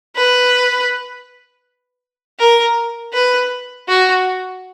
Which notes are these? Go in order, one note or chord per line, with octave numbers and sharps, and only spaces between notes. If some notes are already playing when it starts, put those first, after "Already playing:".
B4
A#4
B4
F#4